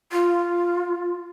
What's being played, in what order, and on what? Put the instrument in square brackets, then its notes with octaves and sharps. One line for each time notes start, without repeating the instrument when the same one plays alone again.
[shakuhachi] F4